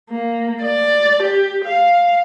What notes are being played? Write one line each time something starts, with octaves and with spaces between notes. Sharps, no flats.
A#3
D5
G4
F5